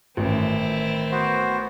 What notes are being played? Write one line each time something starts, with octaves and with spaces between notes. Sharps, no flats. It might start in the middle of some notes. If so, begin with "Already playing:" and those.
A1 D#3 C4 E4
B3 F#4 C5